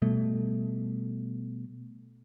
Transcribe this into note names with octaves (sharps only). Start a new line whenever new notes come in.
B2 G3 A3